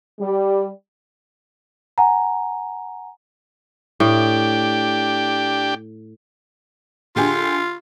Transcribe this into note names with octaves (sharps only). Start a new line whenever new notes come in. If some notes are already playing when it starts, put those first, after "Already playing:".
G3
F#5 G#5 A#5
A2 D4 G4 G5
D3 F4 G4 G#4